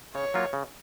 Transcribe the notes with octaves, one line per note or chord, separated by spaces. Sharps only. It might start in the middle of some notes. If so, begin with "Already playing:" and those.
C#3 C#5
F#3 A#3 F4
C#3